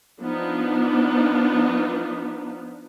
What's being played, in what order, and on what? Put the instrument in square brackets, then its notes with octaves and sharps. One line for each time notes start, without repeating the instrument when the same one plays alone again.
[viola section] F3 B3 D4 D#4